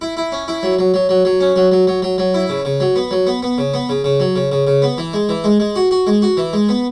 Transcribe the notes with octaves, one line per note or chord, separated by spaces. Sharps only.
E4
E4
C#4
E4
F#3
F#3
F#3
F#3
F#3
C#4
F#3
F#3
F#3
F#3
F#3
E4
C#3
C#3
F#3
B3
F#3
B3
B3
C#3
B3
C#3
C#3
F#3
C#3
C#3
C#3
B3
E3
G#3
E3
G#3
G#3
F#4
F#4
G#3
F#4
E3
G#3
B3